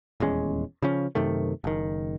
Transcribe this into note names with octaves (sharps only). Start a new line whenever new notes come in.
D#1 E2 G#3 C#4
C#3 F3 C#4
F#2 C3 D#3 A3
F#1 D#3